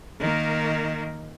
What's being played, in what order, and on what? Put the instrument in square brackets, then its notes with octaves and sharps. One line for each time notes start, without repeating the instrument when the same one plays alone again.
[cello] D#3 A#3